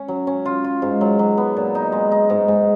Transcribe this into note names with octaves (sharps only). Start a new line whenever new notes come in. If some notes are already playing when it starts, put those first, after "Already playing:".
Already playing: C#4
F#3
C#4
F4
F4
G#2
F#3
F#3
B3
A#2
D#4
G#3
D#4
G#2
G#2